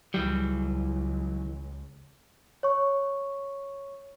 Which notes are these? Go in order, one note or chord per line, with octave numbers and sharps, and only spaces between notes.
C#2 E3 F#3 G3
C#5 C#6